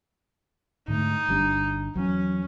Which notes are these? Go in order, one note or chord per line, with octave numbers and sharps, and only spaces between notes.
G#2 D3 A3 D#4
G1 G3 D4
E2 F#3 C#4